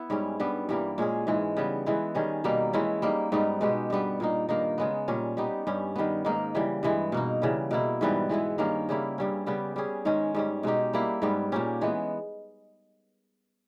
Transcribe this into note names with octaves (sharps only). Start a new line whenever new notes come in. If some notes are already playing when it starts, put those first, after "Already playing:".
Already playing: B3 E4
G#2 G3 C#4
G2 G3 B3
G2 E3 G3 A#3
A#2 G#3 C#4 G#4
G#2 E3 G#3
C#3 G3 B3
E3 G#3 B3 E4
D#3 G3 C#4 G#4
B2 G3 A#3 D#4
E3 G#3 C#4 E4
G3 A#3 D#4
G#2 G3 B3 D#4
B2 G#3 B3 G4
G2 G3 B3
A#2 A#3 D#4
G2 D#3 A#3 D#4
C#3 G#3 B3
A#2 G3 C#4
G3 B3 D#4 G4
G2 G3 C#4
D#3 G3 B3
G#2 D#3 A#3 D#4
C#3 E3 G3
G2 E3 G#3
B2 A#3 D#4
C#3 E3 G3
B2 A#3 E4
G#2 E3 G3 B3
E3 G#3 B3 E4
G2 D#3 A#3 C#4
C#3 G3 A#3 E4
G2 G3 C#4
C#3 G3 B3 G4
G3 C#4 G#4
G#2 D#3 G#3 C#4
G#2 G3 C#4
B2 G#3 D#4 G4
G3 A#3 E4
G#2 G3 B3
A#2 A#3 C#4 G4
E3 G#3 B3